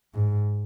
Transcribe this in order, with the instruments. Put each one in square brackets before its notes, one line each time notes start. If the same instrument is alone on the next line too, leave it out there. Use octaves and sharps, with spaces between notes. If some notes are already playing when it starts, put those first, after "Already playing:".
[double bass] G#2